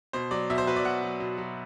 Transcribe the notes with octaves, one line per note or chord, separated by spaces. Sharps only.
B2 C5
F#3 D5
B2 E5
C5
F#3 B4
D5
B2 F#5
F#3
B2
F#3